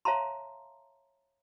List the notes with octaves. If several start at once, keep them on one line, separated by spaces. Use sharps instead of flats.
C#5 E5 F5 A5 A#5 C6